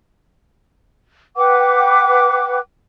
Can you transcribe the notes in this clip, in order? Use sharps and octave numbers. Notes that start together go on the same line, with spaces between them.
B4 F#5 G5 D6